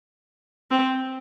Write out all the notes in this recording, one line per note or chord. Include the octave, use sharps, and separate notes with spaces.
C4